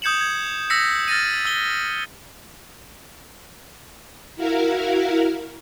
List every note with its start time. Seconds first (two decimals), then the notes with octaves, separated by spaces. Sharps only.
0.02 D#6 G6 G#6 C#7 E7 F#7
0.21 G#6
0.70 E6 A#6 B6 C#7
1.08 F6 A6 A#6 D#7
1.45 E6 G7
4.36 E4 F#4 A#4 F5